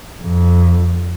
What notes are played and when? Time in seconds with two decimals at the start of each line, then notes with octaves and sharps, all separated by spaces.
0.23 F2